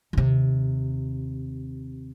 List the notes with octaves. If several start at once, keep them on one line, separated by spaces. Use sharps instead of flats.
D#2 C3